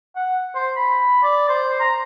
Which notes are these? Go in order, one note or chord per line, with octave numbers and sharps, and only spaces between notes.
F#5
C5
B5
D5
C5
A#5